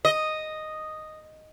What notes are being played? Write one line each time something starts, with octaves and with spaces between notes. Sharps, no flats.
D#5